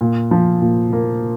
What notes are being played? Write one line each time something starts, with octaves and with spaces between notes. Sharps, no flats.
A#2
F3
A#2
A#3